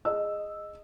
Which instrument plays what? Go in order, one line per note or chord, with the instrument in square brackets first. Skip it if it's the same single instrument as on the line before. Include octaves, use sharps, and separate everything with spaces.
[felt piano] G#4 D#5 E6